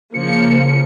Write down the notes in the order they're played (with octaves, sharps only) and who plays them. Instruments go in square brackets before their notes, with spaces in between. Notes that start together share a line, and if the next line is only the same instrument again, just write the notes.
[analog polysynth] C#3 C#7 [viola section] F3 A#3